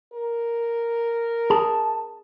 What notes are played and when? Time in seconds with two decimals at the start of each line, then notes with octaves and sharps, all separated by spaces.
0.13 A#4
1.50 G#4 A5